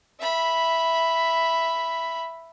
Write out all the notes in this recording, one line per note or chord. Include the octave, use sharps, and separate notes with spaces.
E5 B5